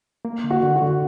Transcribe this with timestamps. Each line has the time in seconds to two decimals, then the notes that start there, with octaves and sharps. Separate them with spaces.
0.25 A#3
0.44 D3
0.51 F#4
0.63 D3
0.76 F#4
0.82 D3